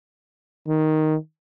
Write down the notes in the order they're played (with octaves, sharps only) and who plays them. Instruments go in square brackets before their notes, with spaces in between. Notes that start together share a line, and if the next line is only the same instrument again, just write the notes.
[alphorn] D#3